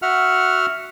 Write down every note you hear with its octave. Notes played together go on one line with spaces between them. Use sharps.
F#4 E5 F#5 F6